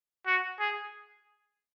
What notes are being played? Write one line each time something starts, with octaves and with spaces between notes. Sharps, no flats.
F#4
G#4